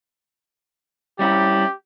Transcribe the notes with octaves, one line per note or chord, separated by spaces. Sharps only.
G3 C#4 E4 G4